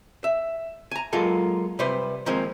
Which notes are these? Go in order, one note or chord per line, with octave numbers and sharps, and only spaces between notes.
E5
G#5 A#5
F#3 G#3 A#3 F4 A4
C3 G3 B4 C5
D#3 F3 G#3 A#3 C4